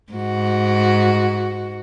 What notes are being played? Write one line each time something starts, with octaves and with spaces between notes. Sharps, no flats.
G#2 F#4